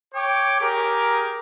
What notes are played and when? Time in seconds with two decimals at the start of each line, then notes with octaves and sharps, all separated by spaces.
0.15 C#5 G5 D6
0.60 G4 G#4 A#4